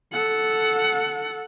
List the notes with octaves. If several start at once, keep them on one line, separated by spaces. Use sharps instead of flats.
A4 F#5